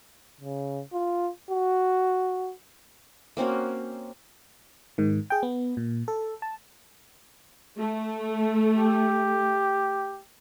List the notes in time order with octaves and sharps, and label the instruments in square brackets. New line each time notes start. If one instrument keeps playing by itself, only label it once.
[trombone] C#3
F4
F#4
[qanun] A#3 C4 C#4 F#4
[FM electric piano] G#2 D#3
G#4 G5
B3
A#2
A4
A5
[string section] A3
[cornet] G4